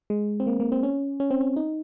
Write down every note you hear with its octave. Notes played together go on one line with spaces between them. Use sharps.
G#3
C4
A#3
A#3
C4
C#4
C#4
C4
C#4
D#4